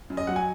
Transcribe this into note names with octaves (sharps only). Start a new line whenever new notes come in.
F#2
D#5
F#3 F#5
G#5